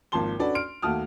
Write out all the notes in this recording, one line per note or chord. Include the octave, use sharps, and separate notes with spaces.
G#1 F3 A#3 A5 C6 G7
C#4 D4 F#4 A4 B4 D5
C6 F6 D7
D#2 A3 F#4 A5 D#6 F6